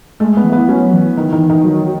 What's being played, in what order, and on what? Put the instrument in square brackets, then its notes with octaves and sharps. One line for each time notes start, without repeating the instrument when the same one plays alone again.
[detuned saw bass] G#3 [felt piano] A3
[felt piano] B3
[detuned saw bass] E3
[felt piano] B3
[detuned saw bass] F#3 [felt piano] C#4
[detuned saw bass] E3
[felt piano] D#3
D#3
D#3
[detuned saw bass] F#3